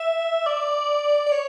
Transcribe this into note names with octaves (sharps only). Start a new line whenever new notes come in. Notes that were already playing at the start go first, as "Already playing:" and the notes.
Already playing: E5
D5
D5
C#5